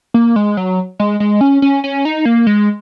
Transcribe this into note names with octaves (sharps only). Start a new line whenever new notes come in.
A#3
G#3
F#3
G#3
G#3
C#4
C#4
C#4
D#4
A#3
G#3